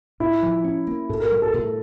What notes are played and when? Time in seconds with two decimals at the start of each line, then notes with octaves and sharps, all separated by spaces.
0.20 A2 E4
0.43 F3
0.65 C#4
0.87 A#3
1.09 A2 A4
1.20 A#4
1.31 G3 A#4
1.42 A4
1.54 A2 A4